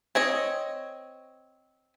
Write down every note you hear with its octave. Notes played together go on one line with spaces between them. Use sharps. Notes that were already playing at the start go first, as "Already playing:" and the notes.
C4 C#5 D#5